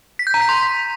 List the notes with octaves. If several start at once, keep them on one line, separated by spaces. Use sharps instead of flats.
B6
G6
A#5
B6
C6